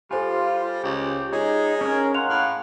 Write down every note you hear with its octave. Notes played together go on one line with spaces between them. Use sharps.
G3 F4 A4 C5 G#5
C#2 G4
G#3 D#4 F4 C#5
C#4 A#4 G#6
F5 F#5 A#5 C6 F7
A2